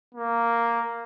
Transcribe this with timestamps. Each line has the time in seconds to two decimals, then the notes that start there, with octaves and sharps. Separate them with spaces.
0.14 A#3